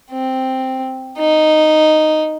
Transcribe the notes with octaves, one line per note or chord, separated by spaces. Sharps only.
C4
D#4